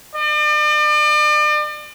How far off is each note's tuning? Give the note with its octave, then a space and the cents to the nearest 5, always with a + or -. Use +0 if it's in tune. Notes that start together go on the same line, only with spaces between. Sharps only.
D5 +40